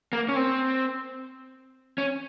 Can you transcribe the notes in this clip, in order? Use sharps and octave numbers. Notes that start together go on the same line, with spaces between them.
A#3
C#4
C4
C#4